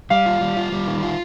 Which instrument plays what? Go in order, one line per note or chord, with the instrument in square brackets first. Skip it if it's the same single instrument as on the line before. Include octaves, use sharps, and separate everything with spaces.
[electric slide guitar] G3 [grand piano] F5
[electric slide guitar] F4
G3
F4
G3
D#3
F4